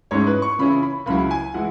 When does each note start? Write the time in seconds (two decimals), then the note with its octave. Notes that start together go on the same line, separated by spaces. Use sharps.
0.11 G#2 G#3 C#4 E4 C#5
0.27 B4
0.42 C#6
0.59 C#3 E3 C#4 E4 B5
0.83 B5
1.06 C#2 C#3 F#3 E4 B5
1.31 G#5
1.54 E3 G#3 E4 F#5